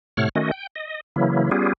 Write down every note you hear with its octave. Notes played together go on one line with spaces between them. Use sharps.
A2 C3 A3 C#5 F#5 F6
D#3 A3 C#4 F#4 D#5
G5
D#5
C#3 E3 F#3 A#3 E4
G3 B3 C#4 F4 G4 G#4